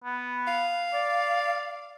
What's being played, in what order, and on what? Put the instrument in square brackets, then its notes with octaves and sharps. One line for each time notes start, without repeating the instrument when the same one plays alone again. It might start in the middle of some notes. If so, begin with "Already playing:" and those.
[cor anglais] B3
[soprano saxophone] F5
[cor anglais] D5